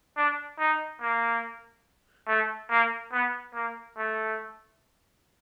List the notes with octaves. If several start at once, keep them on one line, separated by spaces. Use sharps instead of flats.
D4
D#4
A#3
A3
A#3
B3
A#3
A3